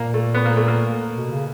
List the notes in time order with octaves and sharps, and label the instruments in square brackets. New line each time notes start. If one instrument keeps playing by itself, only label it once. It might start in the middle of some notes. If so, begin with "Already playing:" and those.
Already playing: [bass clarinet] A#2 [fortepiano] A#3
[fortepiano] A3
B3
A#3
A3
A#3
[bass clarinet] B2
C#3